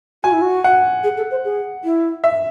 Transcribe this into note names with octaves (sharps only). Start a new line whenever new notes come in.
F#4 G#5
E4
F#4
F#5
G#4
A4
C5
G#4
E4
E5